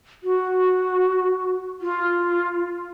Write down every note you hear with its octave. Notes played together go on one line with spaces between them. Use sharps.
F#4
F4